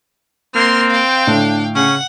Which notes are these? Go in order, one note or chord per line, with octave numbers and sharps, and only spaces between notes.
A#3 C4 C6 F6
F5 G5
A2 D3 D4
C#3 C#4 F#5